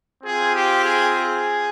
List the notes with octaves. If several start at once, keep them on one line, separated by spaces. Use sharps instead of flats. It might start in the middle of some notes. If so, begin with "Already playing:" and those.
C4 F4 G#4
G4
G#4
G#4